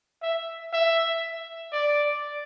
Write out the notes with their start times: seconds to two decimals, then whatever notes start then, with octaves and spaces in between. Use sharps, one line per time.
0.22 E5
0.73 E5
1.73 D5